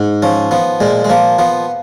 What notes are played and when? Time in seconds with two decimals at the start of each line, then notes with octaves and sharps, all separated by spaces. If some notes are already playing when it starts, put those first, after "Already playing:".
Already playing: G#2
0.22 F3 C#4
0.51 F3 B3
0.80 A#2 G#3
1.04 G#3
1.10 F3 A#3
1.39 F3 B3